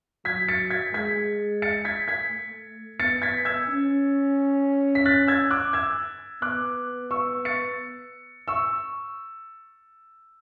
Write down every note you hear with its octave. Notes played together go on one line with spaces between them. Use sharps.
F#3 G#6 B6
A6 C#7
G#6 B6
G#3 G#6 B6
A6 C#7
G#6 B6
G#6 B6
A3
B3 A6 C#7
G#6 B6
E6 G#6
C#4
B6
F#6 A6
E6 G#6
D6 F#6
E6 G#6
B3 D6 F#6
C#6 E6
A6 C#7
C#6 E6